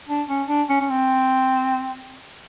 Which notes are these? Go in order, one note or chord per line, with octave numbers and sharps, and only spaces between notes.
D4
C#4
D4
C#4
C#4
C4